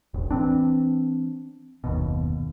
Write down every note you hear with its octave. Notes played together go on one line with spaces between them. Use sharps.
E1 A1
E3 C4 D4
F#1 D#2 B2